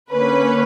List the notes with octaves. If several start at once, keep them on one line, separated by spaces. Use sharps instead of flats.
D3 A#3 C#4 B4